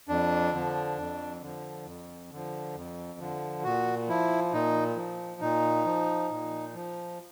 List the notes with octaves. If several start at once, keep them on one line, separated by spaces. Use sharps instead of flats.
F2 D4
D3 F3
F2
D3 F3
F2
D3 F3
F2
D3 F3
A#2 F#4
F3 E4
A#2 D#4
F3
A#2 D#4
F3
A#2
F3